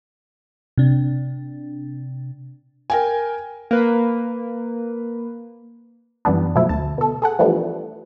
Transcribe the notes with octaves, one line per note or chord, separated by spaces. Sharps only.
C3 D4
A#4 G5 G#5
A#3 B4
F#2 E3 G3 B3 D4
B2 F3 F#3 A3 E4
D2 A5
B2 A4
G#4 A4 F#5
E3 F3 G3 A3 B3 D4